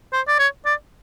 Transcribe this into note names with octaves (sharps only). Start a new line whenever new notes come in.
C5
D5
C#5
D5